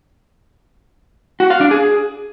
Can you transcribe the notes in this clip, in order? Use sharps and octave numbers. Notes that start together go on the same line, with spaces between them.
F#4
F5
D4
G#4